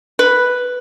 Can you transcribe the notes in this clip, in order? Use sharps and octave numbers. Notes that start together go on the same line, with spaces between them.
B4